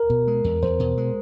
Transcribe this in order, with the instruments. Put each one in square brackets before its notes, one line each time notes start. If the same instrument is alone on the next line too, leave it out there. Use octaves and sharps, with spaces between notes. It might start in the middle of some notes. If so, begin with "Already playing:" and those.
Already playing: [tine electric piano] A#4
[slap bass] B2
G#3
E2
[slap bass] E2 [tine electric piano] C5
[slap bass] B2
G#3